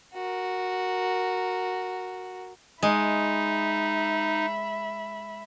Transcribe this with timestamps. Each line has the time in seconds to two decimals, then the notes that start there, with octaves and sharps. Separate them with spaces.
0.14 F#4 A#4
2.83 G#3 D#4 E5 B5